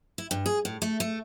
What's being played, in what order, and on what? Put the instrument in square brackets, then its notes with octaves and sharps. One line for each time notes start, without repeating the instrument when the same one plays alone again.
[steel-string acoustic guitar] E4
G2
G#4
A2
A3
A3